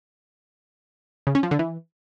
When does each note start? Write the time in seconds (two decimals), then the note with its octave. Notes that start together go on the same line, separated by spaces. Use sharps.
1.27 C#3
1.35 C#4
1.43 F3
1.51 D3
1.59 E3